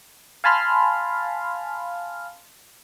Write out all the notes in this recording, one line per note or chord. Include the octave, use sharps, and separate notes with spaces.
F5 G#5 A5 B5 C6 F6